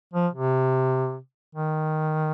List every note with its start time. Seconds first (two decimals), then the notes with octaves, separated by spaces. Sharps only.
0.14 F3
0.33 C3
1.55 D#3